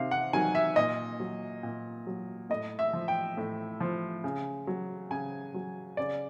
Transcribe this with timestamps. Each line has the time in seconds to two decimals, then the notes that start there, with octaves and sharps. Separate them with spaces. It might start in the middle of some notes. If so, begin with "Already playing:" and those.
Already playing: C3 D#3 F5
0.11 F#5
0.33 D#3 F#3 G#5
0.55 E5
0.76 A#2 D#5
1.20 F#3
1.63 A#2
2.07 F#3
2.50 A2 D#5
2.79 E5
2.93 F3
3.08 G5
3.37 A2
3.80 F3
4.24 C#3
4.67 F#3
5.11 C#3 G#5
5.54 F#3
5.97 C#3 D5